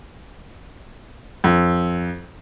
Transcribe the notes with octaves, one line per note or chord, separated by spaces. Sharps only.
F2